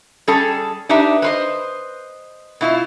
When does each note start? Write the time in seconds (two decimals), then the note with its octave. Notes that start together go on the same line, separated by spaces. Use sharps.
0.27 G3 C#4 G#4 A4 A5
0.89 D4 D#4 G4 B4 E5
1.22 B4 C5 D#5
2.61 B2 E4 F4